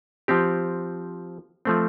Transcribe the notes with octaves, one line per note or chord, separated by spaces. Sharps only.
F3 C4 G4
F3 A3 C4